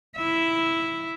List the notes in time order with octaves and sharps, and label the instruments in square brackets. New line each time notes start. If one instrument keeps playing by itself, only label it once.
[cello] E4 E5